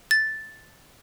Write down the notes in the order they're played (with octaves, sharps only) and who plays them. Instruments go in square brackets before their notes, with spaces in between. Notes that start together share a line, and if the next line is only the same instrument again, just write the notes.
[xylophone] A6